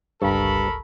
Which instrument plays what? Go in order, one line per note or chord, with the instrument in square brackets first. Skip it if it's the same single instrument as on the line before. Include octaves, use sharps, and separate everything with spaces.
[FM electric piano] G1 C#2 C#6 [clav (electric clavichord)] G2 [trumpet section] A4 A#4 B5